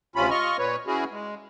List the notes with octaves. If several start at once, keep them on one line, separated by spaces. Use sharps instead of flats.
D2 C3 C#4 F4 B5
F4 D#5 C#6 F6
A#2 B4 C#5
C#4 E4 F#4 G#4
G#3